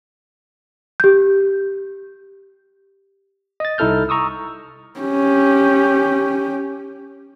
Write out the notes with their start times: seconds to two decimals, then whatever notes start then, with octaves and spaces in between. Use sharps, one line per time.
1.00 G4 G6
3.60 D#5 A6
3.78 C2 D#4 E4 A4 F6 G6
4.09 A#5 C#6 D#6 E6
5.00 C#4 G4